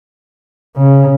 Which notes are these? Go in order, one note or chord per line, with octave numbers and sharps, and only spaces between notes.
C#3